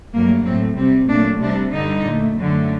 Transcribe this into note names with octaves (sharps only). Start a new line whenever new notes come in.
G2 F#3 A3 A#3
A2 A3 C4
C3 G3 C4
A#2 F#3 A3 D4
C3 G3 D4
G2 D3 G3 D#4
A#2 A3
F#2 D3 A3